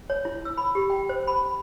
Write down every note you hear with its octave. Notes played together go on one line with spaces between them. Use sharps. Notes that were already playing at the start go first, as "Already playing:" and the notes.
C#5
E4
E6
B5
G4
G5
C5
B5